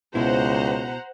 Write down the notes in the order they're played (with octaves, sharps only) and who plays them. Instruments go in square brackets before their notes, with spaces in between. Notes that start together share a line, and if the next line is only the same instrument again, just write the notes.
[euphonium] C#2 [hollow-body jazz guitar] B2 E4 [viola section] C5 F#5 A#5